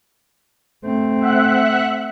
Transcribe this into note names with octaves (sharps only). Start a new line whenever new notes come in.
A3 C4
E5 F#5 F#6